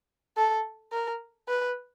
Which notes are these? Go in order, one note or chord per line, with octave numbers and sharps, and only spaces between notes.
A4
A#4
B4